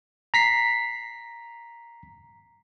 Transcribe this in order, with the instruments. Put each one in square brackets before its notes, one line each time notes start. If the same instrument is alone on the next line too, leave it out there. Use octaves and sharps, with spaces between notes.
[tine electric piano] A#5 B6 C7